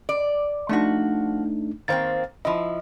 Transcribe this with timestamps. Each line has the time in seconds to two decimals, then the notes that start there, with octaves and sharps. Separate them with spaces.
0.09 D5
0.69 F3 A3 D4 D#4 F#4
1.88 D#3 A#3 C4 C5 F5 A6
2.45 F3 E4 D#5